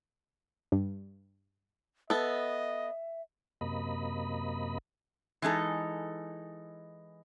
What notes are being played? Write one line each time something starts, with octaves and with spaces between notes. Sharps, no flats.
G2
B3 A4 D#5 E5
F#2 C3 A#3 D#5 B5
E3 G#3 D#4 A4